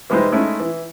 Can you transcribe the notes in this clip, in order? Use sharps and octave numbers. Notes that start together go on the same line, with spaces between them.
E3 G3 G#3 D#4 B4 C5
G#3 A3 C#4 D#4 E4
E3